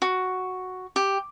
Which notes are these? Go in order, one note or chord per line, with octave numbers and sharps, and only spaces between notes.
F#4
G4